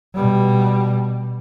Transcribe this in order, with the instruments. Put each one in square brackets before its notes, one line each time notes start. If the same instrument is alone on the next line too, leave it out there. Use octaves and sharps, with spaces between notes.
[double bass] B2 G3